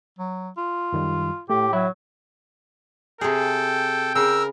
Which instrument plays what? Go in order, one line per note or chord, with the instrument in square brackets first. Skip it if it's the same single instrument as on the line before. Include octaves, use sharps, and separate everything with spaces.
[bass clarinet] F#3
F4
[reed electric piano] F#2 D#3 G3
[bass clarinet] A2 [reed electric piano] A3 [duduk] G4
[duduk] F#3 [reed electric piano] E5 B5
[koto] C3 G#4 [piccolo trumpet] A4 [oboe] G5
[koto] C#3 [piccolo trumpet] A#4 [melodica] E6